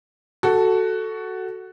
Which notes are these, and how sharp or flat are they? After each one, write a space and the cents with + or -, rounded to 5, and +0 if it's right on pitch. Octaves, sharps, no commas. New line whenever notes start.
F#4 +10 A4 +0